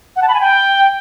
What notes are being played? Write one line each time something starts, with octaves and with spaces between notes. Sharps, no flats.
F#5
A5
B5
G#5
G5